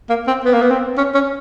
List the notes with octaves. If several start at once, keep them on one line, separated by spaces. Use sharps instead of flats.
A#3
C4
B3
A#3
B3
C4
C#4
C#4